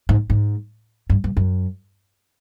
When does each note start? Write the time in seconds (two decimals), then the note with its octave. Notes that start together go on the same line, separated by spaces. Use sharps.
0.09 G#2
0.30 G#2
1.10 G2
1.24 G2
1.37 F#2